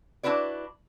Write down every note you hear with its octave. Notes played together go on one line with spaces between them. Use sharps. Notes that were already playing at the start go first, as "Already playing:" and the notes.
D4 E4 F#4 B4 D5